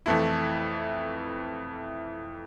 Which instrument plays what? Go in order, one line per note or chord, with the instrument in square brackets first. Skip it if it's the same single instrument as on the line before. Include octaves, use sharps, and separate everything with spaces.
[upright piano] F2 E3 A3 E4